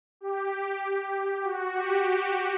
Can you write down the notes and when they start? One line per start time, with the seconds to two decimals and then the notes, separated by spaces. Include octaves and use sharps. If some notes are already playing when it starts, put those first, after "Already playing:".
0.21 G4
1.44 F#4
1.74 G4
2.05 F#4